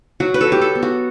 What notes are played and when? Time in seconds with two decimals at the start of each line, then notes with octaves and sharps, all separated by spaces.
0.20 F#3 F#4
0.34 B4
0.41 A4
0.47 F#3 G4
0.61 A4
0.75 B3
0.83 F#4